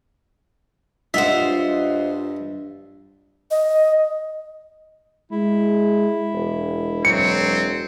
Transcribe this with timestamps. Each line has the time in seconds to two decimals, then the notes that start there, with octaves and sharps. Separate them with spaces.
1.14 G2 F4 C5 D#5 E5 F#5
3.51 D#5
5.31 G#3 E4
6.33 E1
7.05 F#3 C4 C#7